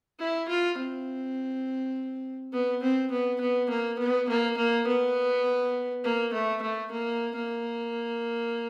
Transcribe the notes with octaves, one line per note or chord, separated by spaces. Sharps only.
E4
F4
C4
B3
C4
B3
B3
A#3
B3
A#3
A#3
B3
A#3
A3
A3
A#3
A#3